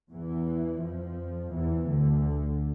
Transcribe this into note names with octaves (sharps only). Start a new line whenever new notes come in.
E2 E3
F2 F3
E2 E3
D2 D3